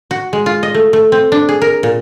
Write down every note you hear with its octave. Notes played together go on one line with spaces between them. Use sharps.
F#4
G#3
F4
D#5
A3
A3
C4
D4
G#4
A#4
A#2